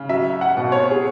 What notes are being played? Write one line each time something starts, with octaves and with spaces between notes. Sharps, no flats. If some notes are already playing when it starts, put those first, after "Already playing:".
Already playing: C#3
F#3 E5
F#5
B2
C#5
G#4